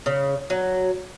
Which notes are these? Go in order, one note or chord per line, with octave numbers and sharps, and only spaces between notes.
C#3
F#3